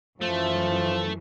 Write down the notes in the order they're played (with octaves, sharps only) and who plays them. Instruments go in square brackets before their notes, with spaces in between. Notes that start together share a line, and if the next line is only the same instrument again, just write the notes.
[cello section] F#2 E3 [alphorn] F3 [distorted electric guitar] A3